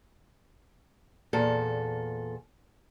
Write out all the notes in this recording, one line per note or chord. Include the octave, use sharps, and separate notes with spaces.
E2 A#2 A4